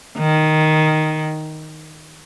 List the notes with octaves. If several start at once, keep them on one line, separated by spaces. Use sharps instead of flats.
D#3